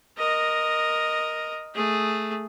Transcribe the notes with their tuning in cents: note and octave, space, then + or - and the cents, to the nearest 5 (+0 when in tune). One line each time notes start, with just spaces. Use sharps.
A#4 +5 D#5 -5
A3 +0 G#4 +0